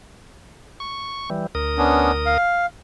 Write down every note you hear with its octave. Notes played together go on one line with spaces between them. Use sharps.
C#6
E3 G3
D2 A#4 D#6
B3 C#4 D4
F5